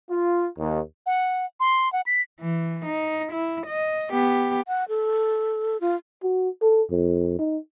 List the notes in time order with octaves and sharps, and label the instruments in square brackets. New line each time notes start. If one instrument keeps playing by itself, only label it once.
[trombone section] F4
D#2
[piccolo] F#5
C6
F#5
B6
[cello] E3
D#4
E4
D#5
B3 G4
[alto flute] F#5
A4
F4
[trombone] F#4
A4
F2
D#4